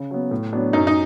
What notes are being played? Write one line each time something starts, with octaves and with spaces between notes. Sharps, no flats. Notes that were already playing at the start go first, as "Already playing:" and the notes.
Already playing: C#3
F#3 B3
A2
F#3 B3 D4
F#2 D#4
D#4